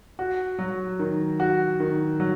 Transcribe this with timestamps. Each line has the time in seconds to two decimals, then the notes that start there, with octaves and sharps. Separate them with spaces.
0.19 F#4
0.59 F#3
0.99 D#3
1.40 F#4
1.80 D#3
2.20 F#3